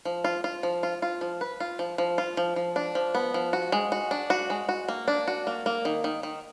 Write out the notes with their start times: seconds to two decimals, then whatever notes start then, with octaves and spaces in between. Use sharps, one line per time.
0.05 F3
0.24 F4
0.44 F4
0.63 F3
0.83 F4
1.02 F4
1.21 F3
1.41 B4
1.60 F4
1.79 F3
1.98 F3
2.18 F4
2.37 F3
2.56 F3
2.76 D4
2.95 F3
3.15 B3
3.34 F3
3.53 F#4
3.72 G#3
3.92 F#4
4.11 D4
4.30 F#4
4.50 G#3
4.69 F#4
4.89 A#3
5.08 D4
5.28 F#4
5.47 A#3
5.66 A#3
5.85 D#3
6.04 D#3
6.23 D#3